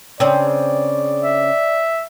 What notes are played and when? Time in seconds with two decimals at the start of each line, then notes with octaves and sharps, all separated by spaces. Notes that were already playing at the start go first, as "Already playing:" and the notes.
0.20 C#3 C4 D4 D5
1.21 E5